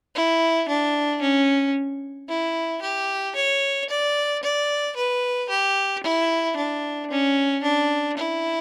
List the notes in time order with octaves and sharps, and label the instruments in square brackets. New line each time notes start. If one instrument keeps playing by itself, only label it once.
[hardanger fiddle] E4
D4
C#4
E4
G4
C#5
D5
D5
B4
G4
E4
D4
C#4
D4
E4